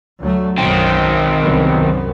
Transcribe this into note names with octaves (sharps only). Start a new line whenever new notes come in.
D2 F#3 A3
B1 F#2 D#3 C4
C2 F#2 B3